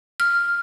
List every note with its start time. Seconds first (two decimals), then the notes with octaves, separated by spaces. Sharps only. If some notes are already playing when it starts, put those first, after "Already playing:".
0.20 F6